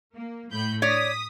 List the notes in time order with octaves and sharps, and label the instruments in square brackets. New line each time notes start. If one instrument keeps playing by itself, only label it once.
[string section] A#3
A2 B5 G6
[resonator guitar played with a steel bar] C#5 D5 [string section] D#6 B6